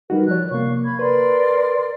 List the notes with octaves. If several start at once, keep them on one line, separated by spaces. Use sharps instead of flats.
G3 D#4 F#4 A#4 B4
F3 C#5 D5 F#6
C3 A#3 F5 C#6
B5 G#6
A#4 B4 D5 C6